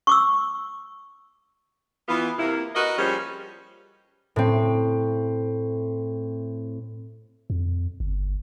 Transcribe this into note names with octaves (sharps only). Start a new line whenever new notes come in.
C#6 D6 E6
E3 B3 F4
C3 A#3 E4
F#4 A#4 B4 D#5
F3 G3 A#3 C#4 G#4 C5
A2 C4
F2
G1